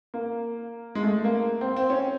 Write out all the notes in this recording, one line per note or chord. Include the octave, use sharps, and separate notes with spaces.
A#3
G#3
A3
A#3
C4
C4
C#4